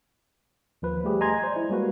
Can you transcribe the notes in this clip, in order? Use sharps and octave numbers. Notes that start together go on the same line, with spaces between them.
D#2 F3 B4
G3 A3 G4 G#4
D#5 G#5 A#5 C6 G#6
C5 D5
E4
G3 G#3 A#3 F#4 B4